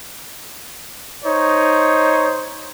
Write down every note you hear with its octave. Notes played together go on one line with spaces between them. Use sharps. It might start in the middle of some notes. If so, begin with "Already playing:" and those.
D#4 C5 C#5